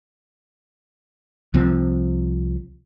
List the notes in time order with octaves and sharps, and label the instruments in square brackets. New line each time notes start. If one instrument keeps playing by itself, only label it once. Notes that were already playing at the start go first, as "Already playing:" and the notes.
[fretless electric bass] C2 C3 F3 C4